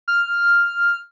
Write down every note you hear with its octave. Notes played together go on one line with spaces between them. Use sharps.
F6